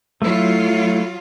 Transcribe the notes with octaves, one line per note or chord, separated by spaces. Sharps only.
F#3 A3 E4 F4